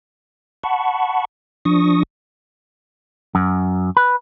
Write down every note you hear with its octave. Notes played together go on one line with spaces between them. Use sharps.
F#5 A5 B5 C#6
F3 D4 C#6 D#6 A#6
F#2
B4